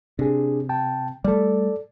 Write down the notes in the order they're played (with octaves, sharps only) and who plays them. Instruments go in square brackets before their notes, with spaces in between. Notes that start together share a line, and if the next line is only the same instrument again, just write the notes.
[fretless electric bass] C3 [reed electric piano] D4 G#4
[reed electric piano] G5 A5
[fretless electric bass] G3 A3 [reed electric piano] A4 D5